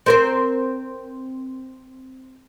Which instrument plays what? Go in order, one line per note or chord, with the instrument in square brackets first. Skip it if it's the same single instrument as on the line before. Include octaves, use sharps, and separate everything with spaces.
[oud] C4 A#4 C5